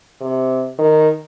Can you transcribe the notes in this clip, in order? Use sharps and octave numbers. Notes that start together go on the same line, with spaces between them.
C3
D#3